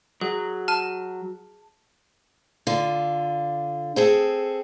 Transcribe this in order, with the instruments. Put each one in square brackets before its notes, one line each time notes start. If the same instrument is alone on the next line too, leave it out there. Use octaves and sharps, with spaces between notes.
[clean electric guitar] F#3 [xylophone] G#4
[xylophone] A5 F6 D#7
[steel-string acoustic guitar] D3 F4
C4 G#4 A4